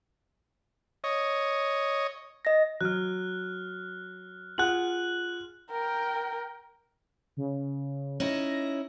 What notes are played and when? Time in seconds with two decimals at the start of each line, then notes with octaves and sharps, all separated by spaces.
1.04 C#5 D#5
2.45 D#5 A#6
2.81 F#3 F6 F#6
4.58 F4 G#4 F#5 F#6 F#7
5.70 A#4 G5
7.37 C#3
8.20 C#4 D#4 E4 A#6